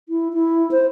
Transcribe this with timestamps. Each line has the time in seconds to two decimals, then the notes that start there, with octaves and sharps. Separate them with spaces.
0.09 E4
0.33 E4
0.71 C5